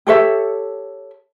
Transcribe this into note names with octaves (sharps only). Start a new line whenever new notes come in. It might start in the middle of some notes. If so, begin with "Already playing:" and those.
G4 A4 C#5 E5